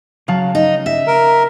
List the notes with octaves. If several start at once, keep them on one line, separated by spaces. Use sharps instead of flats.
C#3 F#3 F5 A5
D#4
E5
A#4